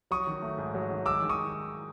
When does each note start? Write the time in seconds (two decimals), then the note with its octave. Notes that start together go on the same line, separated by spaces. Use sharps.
0.11 F#3 C#6 D#6
0.27 D#3
0.42 A3
0.58 G#2
0.75 F#3
0.90 D#3
1.06 G#3 D6 E6
1.22 D#3
1.29 C#6 D#6